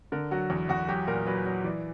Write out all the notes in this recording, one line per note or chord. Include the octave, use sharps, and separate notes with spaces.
D3 A#4
F#3 F#4
E2
E2 F#4
F#3 G4
A#2 A#4
F#3 B4
F#3
E3 D5